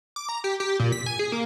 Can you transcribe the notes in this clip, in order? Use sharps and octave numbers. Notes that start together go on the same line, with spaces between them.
D6
A#5
G4
G4
A#2
B6
G#5
G#4
A#3